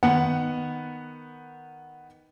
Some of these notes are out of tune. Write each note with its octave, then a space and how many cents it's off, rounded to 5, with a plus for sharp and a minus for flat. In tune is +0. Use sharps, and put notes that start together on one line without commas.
D#3 +0 B3 +0 F#5 +0